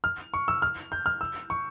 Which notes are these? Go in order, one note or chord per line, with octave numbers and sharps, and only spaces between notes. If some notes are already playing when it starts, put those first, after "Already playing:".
F6
C#6
E6
F6
G6
F6
E6
C#6